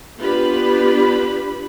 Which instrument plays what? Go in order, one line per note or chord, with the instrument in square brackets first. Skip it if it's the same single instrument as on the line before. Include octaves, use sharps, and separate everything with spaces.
[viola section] B3 D4 F4 G4 B4 B5